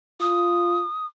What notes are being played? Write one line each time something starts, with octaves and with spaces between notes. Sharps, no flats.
F4 D#6